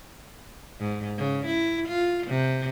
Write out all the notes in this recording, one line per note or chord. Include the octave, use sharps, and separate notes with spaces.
G#2
C#3
E4
F4
C3